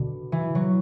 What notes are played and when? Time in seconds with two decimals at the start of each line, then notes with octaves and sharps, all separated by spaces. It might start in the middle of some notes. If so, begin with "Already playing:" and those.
Already playing: B2 D3
0.32 E3
0.55 F#3